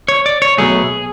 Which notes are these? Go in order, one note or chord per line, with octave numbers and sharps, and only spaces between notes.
C#5
D5
C#5
B1 B2 F#3 A3 G#4